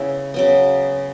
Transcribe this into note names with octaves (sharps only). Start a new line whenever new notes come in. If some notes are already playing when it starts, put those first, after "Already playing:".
Already playing: C#3 B3 E4
C#3 F#3 B3